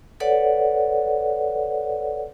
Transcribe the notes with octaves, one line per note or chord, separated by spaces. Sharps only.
A4 B4 C#5 D5 F#5